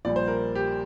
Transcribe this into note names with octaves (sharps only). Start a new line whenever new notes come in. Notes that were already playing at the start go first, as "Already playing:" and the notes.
A#1 A#2 G3 D5
C5
A#4
G4